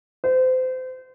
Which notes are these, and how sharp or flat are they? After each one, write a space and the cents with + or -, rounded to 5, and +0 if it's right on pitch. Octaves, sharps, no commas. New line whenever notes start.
C5 -30